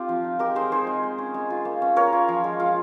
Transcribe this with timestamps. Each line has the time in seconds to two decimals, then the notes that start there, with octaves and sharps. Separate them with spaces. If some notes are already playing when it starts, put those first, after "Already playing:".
Already playing: C4 F4 G4
0.09 F3
0.24 D#4
0.39 G#3 G4 A#4
0.55 D#4 G#4 C5
0.72 D#4 G#4 C5
0.87 G#3
1.03 G#3
1.18 C#4
1.34 G#3
1.50 F4
1.65 A#3
1.82 C#4
1.96 A#3 A#4 C#5
2.13 F4
2.28 F3
2.44 G#3
2.60 F4